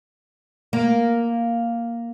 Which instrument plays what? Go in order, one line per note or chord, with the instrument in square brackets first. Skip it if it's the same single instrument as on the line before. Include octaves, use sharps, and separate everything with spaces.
[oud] A#3